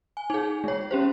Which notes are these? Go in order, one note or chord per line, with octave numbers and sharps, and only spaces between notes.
G#5
D#4 G#4
G#3 C#5
C#4 G4 C5